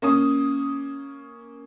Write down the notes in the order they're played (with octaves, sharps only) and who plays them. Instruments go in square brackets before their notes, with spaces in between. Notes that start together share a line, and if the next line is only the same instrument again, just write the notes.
[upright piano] A#3 C#4 D#6